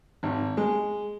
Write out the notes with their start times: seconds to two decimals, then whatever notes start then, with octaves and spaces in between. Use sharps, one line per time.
0.23 G#1
0.57 G#3